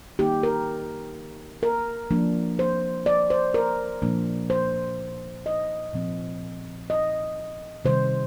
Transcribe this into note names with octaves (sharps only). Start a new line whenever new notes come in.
D#3 A#3 D#4 G4
A#4
A#4
F3 A#3 D4
C5
D5
C5
A#4
A#2 F3 A#3 D4
C5
D#5
A#2 F3 C4
D#5
C3 D#3 G3 C5